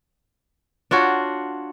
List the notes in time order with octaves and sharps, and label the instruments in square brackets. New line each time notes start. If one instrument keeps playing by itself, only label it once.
[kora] D4 F4 F#4 C#5